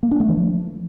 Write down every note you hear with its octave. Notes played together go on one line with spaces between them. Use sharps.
A#3
D4
A3
E3
F3